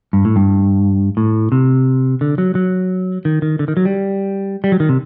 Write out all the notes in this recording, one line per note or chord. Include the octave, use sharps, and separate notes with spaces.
G2
A2
G2
A2
C3
D3
F#3
F#3
D#3
D#3
D3
D#3
F#3
G3
G3
F#3
D#3
C3